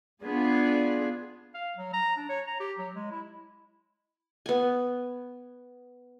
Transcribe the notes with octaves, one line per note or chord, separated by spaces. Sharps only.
B3 D4 F4 G#4
F5
F#3
A#5
D4
C#5
A#5
G4
F#3
G#3
E4
B3 G#5